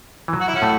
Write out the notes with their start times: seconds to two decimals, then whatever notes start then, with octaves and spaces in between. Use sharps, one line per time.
0.28 E3
0.33 F#3
0.41 F#4
0.48 E4
0.55 C#4 F#4
0.62 A2 A3